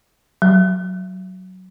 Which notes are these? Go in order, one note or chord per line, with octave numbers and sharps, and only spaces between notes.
F#3